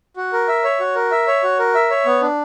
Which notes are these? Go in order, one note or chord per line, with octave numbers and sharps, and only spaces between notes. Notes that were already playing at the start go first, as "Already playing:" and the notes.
F#4
A#4
E5
C#5
F#4
A#4
E5
C#5
F#4
A#4
E5
C#5
B3
D4